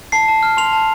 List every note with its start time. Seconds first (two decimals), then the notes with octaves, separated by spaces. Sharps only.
0.12 A5 C7
0.28 A5
0.43 F6
0.57 C6 F7
0.73 A5